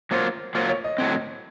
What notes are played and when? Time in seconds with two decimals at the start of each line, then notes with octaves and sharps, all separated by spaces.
0.11 F#3 A#3 F4 C5
0.55 F#3 A#3 F4 C5
0.69 C#5
0.84 D#5
0.98 A2 F#3 C4